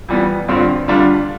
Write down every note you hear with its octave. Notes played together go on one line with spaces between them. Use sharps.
F2 E3 G3 B3
G2 D3 F3 C4 F4
D3 G3 D4 F4